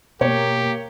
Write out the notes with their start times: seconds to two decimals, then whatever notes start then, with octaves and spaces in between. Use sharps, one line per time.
0.21 B2 A#3 G4 C#5